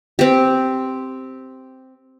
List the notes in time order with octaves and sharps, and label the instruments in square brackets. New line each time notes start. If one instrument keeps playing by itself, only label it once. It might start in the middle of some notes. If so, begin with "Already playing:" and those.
[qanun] C4 G4